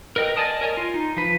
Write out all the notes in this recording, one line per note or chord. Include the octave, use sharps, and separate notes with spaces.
A#4 B4 D#5 G5
D5 D#5 G#5 A5 D#6
A#4 C#5 D#5 G#5
F4
D#4
F3 B4